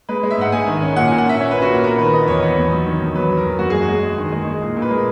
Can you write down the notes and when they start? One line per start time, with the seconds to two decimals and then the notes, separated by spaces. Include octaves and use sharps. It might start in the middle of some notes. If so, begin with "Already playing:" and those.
0.09 G#3 B4
0.23 G#3
0.31 E5
0.38 G#2 F#5
0.52 G#3 G#5
0.67 D#3
0.81 C#4
0.96 A#2 F#5
1.07 G#5
1.11 A#2
1.18 F#5
1.25 C#4 E5
1.40 C#4 C#5
1.51 B4
1.55 C#4
1.62 F#4
1.70 A#2 A#4
1.84 B3 A#4
1.98 D#3 B4
2.13 B3 D#5
2.28 E2 C#5
2.42 B3
2.57 E2
2.72 F#3
2.86 D#3
3.01 E2
3.15 F#3 B4
3.30 F#3
3.37 A#4
3.45 E2
3.59 F#2 F#4
3.70 G#4
3.74 G#3
3.81 F#4
3.89 G#3 G#4
4.03 G#3
4.18 D#3
4.32 G#3
4.47 G#3
4.61 A#2
4.76 A#2
4.82 B4
4.91 G#3 A#4